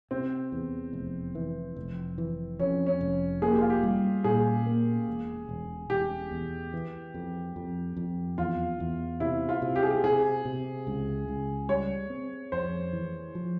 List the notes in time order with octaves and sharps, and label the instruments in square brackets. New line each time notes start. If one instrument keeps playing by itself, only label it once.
[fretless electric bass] C3 [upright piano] C4
[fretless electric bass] E2
F1
E3
F1
E3
[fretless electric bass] F2 [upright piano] C#4
[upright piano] C#4
[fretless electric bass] F1
[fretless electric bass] A#3 [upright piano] G#4
[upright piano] G4
F4
G4
[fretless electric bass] G3
[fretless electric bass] A#2 [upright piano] G#4
[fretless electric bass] A#3
E1
E1
[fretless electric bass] E1 [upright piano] G4
[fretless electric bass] E2
E3
F2
F2
F2
[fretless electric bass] E2 [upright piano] F4
[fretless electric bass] E2
[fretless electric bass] C3 [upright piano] E4
[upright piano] F4
[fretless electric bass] C3
[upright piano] G4
G#4
G4
[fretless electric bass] C3 [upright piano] G#4
[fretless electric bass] C3
C#2
C#2
[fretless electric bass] G3 [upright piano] C#5
[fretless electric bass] C4
[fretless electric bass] F2 [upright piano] C5
[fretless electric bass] E3
F3